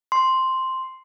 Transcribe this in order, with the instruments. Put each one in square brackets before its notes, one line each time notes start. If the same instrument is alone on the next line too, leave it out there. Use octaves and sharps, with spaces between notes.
[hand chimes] C6